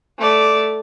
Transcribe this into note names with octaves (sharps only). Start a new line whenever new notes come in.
A3 D5